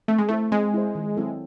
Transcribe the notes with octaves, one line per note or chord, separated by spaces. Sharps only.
A3 C4
G#3
A3 E4 C5
G#3 C4
E4 C5
D#3
F#3 C4 E4 A4